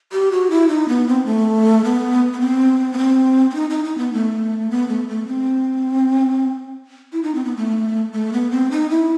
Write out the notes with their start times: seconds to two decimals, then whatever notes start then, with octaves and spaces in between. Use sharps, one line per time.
0.12 G4
0.32 F#4
0.51 E4
0.69 D#4
0.88 B3
1.08 C4
1.26 A3
1.84 B3
2.33 B3
2.41 C4
2.93 B3
2.98 C4
3.50 C4
3.55 D#4
3.70 D#4
3.85 D#4
3.98 B3
4.13 A3
4.71 B3
4.88 A3
5.09 A3
5.28 C4
7.13 E4
7.23 D#4
7.35 C4
7.45 B3
7.57 A3
8.13 A3
8.33 B3
8.51 C4
8.71 D#4
8.90 E4